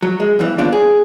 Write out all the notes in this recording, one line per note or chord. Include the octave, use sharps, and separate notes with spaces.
F#3
G#3
E2 G2 E3
D#2 B3 D4 F4 D5
G#4